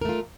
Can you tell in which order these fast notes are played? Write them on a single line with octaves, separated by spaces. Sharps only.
A#4 A3 F4